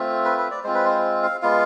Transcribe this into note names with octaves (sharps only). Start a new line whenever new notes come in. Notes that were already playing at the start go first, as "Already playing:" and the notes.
Already playing: A3 C4 F4
B4
B4
D5
G#3 C4 F4 C5
B4
C5
F5
G#3 B3 F4 F5